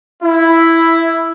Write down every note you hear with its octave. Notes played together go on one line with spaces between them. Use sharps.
E4